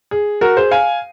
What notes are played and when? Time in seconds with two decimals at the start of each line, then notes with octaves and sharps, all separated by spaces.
0.11 G#4
0.41 F#4 A#4
0.57 G#4 C5
0.71 F5 G#5